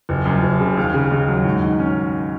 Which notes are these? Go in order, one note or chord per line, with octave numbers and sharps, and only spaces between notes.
F#1
F#2
F#1
C#3
D#2
C#3
D#2
F#3
G#2
D#3
C#4